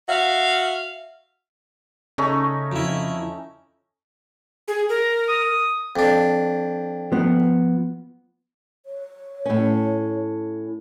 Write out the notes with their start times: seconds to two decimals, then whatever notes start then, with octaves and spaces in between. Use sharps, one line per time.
0.09 F#4 E5 F5
2.18 C#3 A3 C#4 D#4
2.72 F2 E4
4.68 G#4
4.89 A#4
5.29 D#6
5.96 F2 D4
7.12 F3 B3
8.86 C#5
9.45 A2 C#4